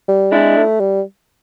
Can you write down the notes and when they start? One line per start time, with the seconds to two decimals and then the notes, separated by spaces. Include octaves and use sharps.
0.08 G3
0.32 G#3 D4 E4
0.56 A3
0.80 G3